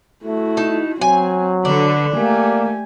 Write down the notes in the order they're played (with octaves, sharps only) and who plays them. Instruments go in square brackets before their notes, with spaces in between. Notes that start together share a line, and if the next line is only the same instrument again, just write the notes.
[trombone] A3 [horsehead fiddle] E4 F#4
[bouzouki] D#4 A5
[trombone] F#3 [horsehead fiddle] C4 [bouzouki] G#5
[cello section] D3 [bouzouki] D4 [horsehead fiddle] B4
[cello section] A3 [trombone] A#3 [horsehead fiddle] G4 G#5